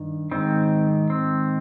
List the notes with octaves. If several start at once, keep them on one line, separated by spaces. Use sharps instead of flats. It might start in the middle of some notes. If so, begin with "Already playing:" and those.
Already playing: G2 D#3
G#2 D#3 C4
C4